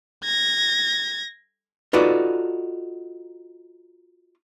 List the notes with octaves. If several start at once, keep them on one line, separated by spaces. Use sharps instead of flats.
G#6 A#6
D#4 F4 F#4 A4 B4 D5